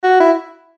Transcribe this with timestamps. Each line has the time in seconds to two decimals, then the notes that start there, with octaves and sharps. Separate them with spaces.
0.03 F#4
0.20 E4